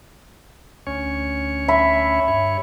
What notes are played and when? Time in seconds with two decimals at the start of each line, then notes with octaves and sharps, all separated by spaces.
0.87 D2 C#4 C#5
1.68 E5 B5
2.28 G2 C#5